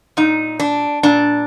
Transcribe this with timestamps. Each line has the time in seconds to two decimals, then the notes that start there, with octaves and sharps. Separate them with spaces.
0.17 A#2 D#4
0.59 D4
1.03 A#2 D4